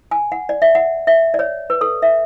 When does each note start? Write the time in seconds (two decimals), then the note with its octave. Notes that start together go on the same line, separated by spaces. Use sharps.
0.11 G#5
0.32 F#5
0.49 D5
0.62 E5
0.75 F#5
1.07 E5
1.34 D5
1.39 C#5
1.70 B4
1.81 A4
2.02 E5